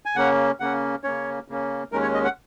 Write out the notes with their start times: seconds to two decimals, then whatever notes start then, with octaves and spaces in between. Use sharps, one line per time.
0.06 G#5
0.16 C#3 A#3 C#4 F#5
0.60 C#3 A#3 C#4 F#5
1.04 C#3 A#3 C#4 C#5
1.48 C#3 A#3 C#4
1.92 D#2 D#3 G#3 C#4 A#4
2.02 C#5
2.14 D#5
2.24 F#5